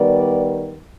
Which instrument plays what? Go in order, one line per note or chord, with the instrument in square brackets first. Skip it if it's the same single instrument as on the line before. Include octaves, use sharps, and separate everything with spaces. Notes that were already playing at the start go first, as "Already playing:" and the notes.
Already playing: [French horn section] D#3 G3 B3 D5